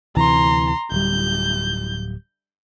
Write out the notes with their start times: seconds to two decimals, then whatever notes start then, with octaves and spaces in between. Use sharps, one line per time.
0.16 D2 C3 E3 A#5 C6
0.92 D1 G3 G6